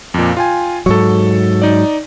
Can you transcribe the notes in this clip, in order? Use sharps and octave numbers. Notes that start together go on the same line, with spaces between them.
F2 A#2
F4 G5 G#5
G#2 F#3 A4 C#6
D#4 D5